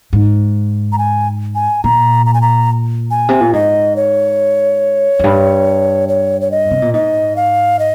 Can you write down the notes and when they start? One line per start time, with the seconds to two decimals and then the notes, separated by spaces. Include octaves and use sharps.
0.13 G#2
0.92 A#5
0.98 G#5
1.55 G#5
1.84 A#2 A#5
2.26 A#5
2.34 G#5
2.42 A#5
3.11 G#5
3.29 C3
3.41 A#2
3.53 G#2 D#5
3.96 C#5
5.19 F2
5.24 G2
6.09 C#5
6.41 C#5
6.51 D#5
6.71 C3
6.82 A#2
6.94 G#2 D#5
7.36 F5
7.79 D#5